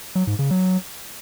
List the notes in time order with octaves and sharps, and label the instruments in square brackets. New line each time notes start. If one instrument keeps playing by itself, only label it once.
[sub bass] F#3
G#2
C#3
F#3